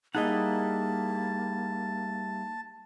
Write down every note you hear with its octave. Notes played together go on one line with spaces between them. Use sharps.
G3 A#3 D#4 E4 G#4 D#5 F#5 A5